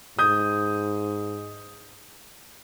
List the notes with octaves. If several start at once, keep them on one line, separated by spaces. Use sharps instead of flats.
G#2 D#6 G6